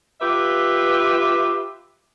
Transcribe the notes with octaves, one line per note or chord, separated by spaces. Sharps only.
F4 G4 B4 E5